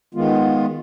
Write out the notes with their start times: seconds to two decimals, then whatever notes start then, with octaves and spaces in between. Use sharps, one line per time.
0.15 D#3 G#3 B3 F4